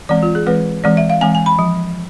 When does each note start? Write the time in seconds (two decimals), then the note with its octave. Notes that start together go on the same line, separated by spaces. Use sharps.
0.09 E3 G#3 C4 D5
0.23 F4
0.35 G#4
0.46 E3 G#3 C4 B4
0.84 E3 G#3 C4 D5
0.97 E5
1.10 F5
1.21 E3 G#3 C4 G#5
1.35 G#5
1.46 B5
1.59 F3